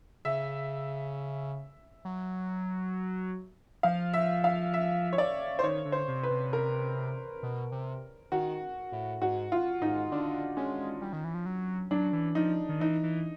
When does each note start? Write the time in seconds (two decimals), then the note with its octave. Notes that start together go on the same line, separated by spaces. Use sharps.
0.25 C#3 E5
2.05 F#3
3.83 F3 F5
4.14 E5
4.44 F5
4.74 E5
5.13 C#5
5.18 D5
5.59 C5
5.63 D#3 C#5
5.85 D3
5.92 C5
6.08 C3
6.23 B4
6.30 C3
6.53 A#4
7.43 B2
7.72 C3
8.32 D#3 F#4
8.92 A2
9.22 G#2 F#4
9.52 F4
9.81 G#2 D#4
10.11 D3 D4
10.57 G#3 C#4
11.01 G3
11.13 D#3
11.24 E3
11.34 F3
11.46 F#3
11.91 F#3 D4
12.13 E3
12.35 F3 D#4
12.69 D#3
12.80 E3 D#4
13.03 E3